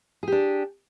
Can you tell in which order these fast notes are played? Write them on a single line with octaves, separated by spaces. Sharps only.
G#4 G4 D4